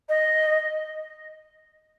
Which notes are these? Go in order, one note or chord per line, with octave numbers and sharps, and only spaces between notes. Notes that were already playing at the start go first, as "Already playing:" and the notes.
D#5